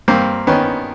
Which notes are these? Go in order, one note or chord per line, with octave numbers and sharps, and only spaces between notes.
G2 A#3 C4
D#3 B3 C#4